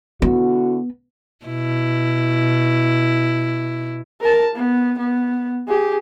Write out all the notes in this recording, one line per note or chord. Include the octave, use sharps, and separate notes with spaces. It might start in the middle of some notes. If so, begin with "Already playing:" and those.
D3 B3 E4 F#4
B2 E4
A#4 A5
B3
B3
G4 G#4